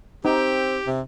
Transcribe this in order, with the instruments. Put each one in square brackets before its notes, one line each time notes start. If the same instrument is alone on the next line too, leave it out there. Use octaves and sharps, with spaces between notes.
[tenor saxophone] C4 [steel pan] D#4 [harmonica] G4
[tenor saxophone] C3